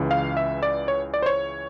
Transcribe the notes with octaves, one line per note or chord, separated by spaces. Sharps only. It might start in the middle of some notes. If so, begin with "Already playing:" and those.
Already playing: C#2 C#3 E3
F5
E5
D5
C#5
D5
C5
C#5